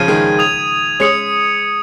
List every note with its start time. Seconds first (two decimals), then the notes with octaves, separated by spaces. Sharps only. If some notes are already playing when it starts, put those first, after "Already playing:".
Already playing: C#3 F3 G#6 D#7
0.08 D#3 G#3
0.39 D#6 G#6 F7
1.00 G#3 C#4 D#6 C#7 F7